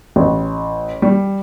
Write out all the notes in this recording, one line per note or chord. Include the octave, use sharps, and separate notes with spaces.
A1
G3